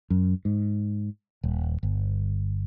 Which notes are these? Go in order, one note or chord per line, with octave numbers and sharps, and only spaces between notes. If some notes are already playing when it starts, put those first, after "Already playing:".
F#2
G#2
D#1
G1